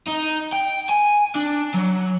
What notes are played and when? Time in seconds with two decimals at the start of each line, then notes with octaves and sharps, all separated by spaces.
0.08 D#4
0.53 G5
0.89 G#5
1.35 D4
1.74 F#3